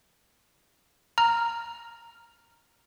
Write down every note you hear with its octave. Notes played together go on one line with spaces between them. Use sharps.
A#5 F6